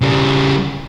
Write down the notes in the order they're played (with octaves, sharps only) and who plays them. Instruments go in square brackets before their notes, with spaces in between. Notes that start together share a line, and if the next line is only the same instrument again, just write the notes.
[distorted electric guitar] C#3 G3